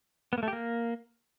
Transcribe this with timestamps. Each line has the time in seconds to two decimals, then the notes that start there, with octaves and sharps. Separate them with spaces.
0.33 B3
0.38 A#3
0.43 A3
0.48 G4
0.53 A#3